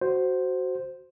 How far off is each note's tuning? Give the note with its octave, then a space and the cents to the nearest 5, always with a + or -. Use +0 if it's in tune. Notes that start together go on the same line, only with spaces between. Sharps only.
F#4 +10 C5 +0